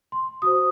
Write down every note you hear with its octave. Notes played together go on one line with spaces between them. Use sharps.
C6
F#4 C5 D#6